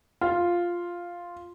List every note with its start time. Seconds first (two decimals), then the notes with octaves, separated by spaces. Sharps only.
0.21 F4